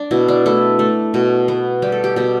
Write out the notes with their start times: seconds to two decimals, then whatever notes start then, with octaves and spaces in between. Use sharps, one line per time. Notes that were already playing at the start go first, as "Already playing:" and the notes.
Already playing: D4
0.11 B2 E4
0.28 D4
0.46 A3 E4
0.79 A3
1.14 B2
1.48 B3
1.82 G3 G4
1.92 A4
2.04 G4
2.16 B2 G4